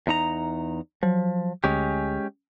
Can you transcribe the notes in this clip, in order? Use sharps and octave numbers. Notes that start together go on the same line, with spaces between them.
E2 D#4 A#5
F3 F#3
D2 G#3 C#4 G4